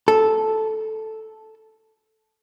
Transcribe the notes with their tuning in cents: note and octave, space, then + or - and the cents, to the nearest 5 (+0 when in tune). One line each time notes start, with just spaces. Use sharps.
A4 -5